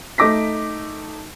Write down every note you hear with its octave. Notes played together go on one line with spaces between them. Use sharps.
A3 D#4 D6 A#6 B6